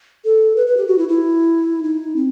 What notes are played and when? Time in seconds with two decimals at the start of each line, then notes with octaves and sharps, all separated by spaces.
0.25 A4
0.56 B4
0.67 B4
0.77 G4
0.88 F#4
0.98 E4
1.09 E4
1.83 D#4
2.16 C4